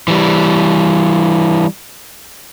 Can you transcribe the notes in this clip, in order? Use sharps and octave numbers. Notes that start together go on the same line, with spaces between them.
E3 G3